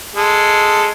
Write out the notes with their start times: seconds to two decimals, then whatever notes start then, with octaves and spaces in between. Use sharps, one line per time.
0.16 G#3 A4